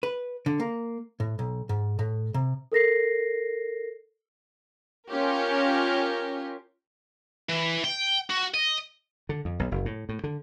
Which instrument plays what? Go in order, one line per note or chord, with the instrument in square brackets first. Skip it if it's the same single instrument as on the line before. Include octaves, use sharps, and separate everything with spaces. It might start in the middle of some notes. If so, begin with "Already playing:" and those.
[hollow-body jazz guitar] B4
D3
A#3
A2
B1
G#2
A2
C3
[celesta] A4 A#4 A#6 C7
[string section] C#4 F4 G4 A#4
[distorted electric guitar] E3
G5
F#4
D#5
[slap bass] D3
F2
B1
F#1
A2
A2
D3